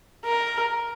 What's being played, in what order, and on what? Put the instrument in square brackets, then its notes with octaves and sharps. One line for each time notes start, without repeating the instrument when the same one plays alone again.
[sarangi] A#4